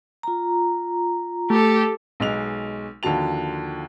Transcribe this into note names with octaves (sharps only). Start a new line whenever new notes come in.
F4 A#5
A3 G4 A4
B1 G#3 F7
D#2 D3 F3 F#4 A5 F7